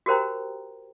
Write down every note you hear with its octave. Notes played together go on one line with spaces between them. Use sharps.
F#4 G4 A#4 C5 G5 A#5